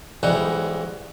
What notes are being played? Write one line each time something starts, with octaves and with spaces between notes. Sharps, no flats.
B1 G#2 E3 G3 F#5